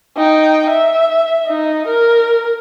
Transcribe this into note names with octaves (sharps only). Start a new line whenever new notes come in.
D#4 G5
E5
D#4
A#4